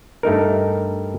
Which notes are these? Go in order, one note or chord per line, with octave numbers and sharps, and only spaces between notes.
G2 A3 D#4 A#4